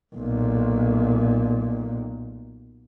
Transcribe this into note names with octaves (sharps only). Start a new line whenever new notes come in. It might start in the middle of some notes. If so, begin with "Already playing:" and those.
B1 A#2